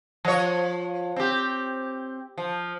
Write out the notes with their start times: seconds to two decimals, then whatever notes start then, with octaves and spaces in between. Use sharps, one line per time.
0.25 F3 C#5
1.16 C4 G4
2.38 F3